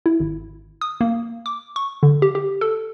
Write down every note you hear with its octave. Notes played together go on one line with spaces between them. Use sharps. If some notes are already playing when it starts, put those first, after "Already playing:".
E4
G#1
D#6
A#3
D6
C#6
D3
G4
G4
A4